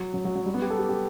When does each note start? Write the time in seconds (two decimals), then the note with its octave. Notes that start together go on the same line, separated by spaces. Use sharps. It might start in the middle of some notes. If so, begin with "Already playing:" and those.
Already playing: F#3
0.14 F#3
0.25 F#3
0.35 F#3
0.46 G3
0.54 B3
0.62 G4
0.70 A4
0.79 G4
0.89 G4